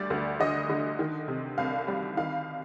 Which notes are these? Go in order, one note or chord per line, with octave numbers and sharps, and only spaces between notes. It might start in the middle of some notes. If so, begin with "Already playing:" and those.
Already playing: D2 G3 D5
D2
D3 D#5
D3
D#3
C3
C2 F5
G3
D#3 F5